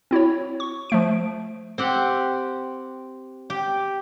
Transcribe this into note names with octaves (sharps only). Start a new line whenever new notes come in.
C4 E4 F#4 C#5
C#6
F3 A3 D7
C4 G4 F#5
G4